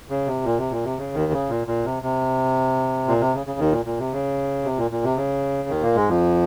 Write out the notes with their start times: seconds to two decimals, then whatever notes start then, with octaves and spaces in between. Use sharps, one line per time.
0.10 C#3
0.27 C3
0.44 A#2
0.58 C3
0.71 A#2
0.85 C3
0.97 C#3
1.15 D#2 D#3
1.32 C#3
1.49 A#2
1.67 A#2
1.85 C3
2.03 C3
3.08 A#2
3.20 C3
3.34 C#3
3.46 C#3
3.59 D#2 D#3
3.72 A#2
3.85 A#2
3.99 C3
4.12 C#3
4.64 C3
4.77 A#2
4.91 A#2
5.04 C3
5.17 C#3
5.69 D#2 D#3
5.82 A#2 A#3
5.96 G#2 G#3
6.09 F2 F3